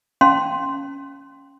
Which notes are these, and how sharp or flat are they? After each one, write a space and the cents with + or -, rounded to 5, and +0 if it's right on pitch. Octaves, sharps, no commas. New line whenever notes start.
C#4 +0 F5 +25 C6 +0